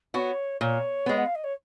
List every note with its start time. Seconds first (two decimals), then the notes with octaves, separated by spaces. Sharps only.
0.14 B3 F#4 C#5
0.61 A#2 C#5
1.06 G#3 B3
1.17 F#5
1.26 F5
1.35 D#5
1.44 C#5